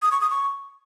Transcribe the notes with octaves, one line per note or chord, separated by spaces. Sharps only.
D#6
C#6
D#6
C#6